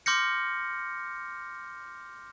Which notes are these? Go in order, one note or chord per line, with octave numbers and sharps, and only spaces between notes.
C6 D6 F6 G6 A#6 C#7